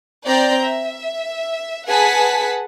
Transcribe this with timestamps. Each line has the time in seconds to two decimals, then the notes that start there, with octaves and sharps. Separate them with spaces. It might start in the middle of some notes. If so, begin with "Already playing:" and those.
0.24 C4 D5 A#5 G6
0.65 E5
1.88 G#4 B4 F#5 G#5 A5 B6